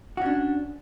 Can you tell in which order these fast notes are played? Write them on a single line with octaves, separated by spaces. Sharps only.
F#4 C#4 D4